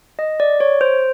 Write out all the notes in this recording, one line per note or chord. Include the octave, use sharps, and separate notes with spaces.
D#5
D5
C#5
C5